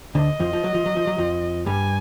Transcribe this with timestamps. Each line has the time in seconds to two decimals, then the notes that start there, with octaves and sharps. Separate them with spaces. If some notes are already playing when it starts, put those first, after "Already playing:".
0.15 D2 D3 D#5
0.40 F2 F3
0.53 F3
0.64 F#3
0.74 F3
0.86 F#3
0.97 F3
1.07 F#3
1.18 F2 F3
1.66 G2 G3 G#5